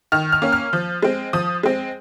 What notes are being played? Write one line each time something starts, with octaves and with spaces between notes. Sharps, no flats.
D#3 F6
F6
A#3 C#4
F6
F3
G#3 C4
F3 D#6
G#3 C4